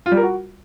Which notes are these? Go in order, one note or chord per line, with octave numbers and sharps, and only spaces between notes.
F4
G3
A#4
F#4